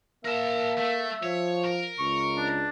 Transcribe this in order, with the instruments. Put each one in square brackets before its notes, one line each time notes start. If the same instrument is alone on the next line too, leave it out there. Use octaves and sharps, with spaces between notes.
[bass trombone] A#3 [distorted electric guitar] A#4 A5 [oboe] E5
[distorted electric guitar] A3
[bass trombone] F3 [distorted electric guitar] C#5
[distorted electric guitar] A#4
[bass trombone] C#2 [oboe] C#6
[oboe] D4